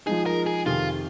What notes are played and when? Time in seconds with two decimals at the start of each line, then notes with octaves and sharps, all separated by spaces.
0.06 F3 G#3 D#4 G#4
0.26 A#4
0.46 G#4
0.66 F2 C3 D#3 F4